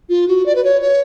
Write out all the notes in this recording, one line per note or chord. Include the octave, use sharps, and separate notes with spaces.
F4
F#4
D5
B4
C#5
C#5